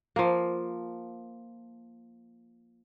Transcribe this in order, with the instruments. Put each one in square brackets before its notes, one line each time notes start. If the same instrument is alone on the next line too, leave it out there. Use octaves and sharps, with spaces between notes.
[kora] F3 A#3